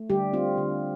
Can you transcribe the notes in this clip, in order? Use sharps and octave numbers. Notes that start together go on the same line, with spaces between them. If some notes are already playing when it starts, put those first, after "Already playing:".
Already playing: A3
D3 G3 G4
C4 F4
D3